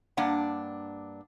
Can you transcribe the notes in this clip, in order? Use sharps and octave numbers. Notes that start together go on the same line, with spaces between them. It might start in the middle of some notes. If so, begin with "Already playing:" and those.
G2 A#3 D4 F#5